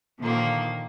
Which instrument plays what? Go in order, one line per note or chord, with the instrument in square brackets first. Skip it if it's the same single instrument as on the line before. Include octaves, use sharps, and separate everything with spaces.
[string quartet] A#2 D3 D#3 F3 A#3 D#4